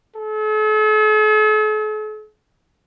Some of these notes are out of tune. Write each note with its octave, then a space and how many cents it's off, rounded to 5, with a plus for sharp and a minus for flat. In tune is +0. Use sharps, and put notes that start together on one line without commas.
A4 -45